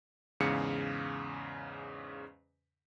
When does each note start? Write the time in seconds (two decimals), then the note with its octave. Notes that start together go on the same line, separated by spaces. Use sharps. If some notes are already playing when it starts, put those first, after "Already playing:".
0.40 E2 G#2 C#3 F5 C#7